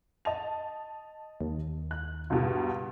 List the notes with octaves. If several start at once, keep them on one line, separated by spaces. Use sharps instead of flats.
D#5 A5 F7
D#2
F#6
C#2 G2 B2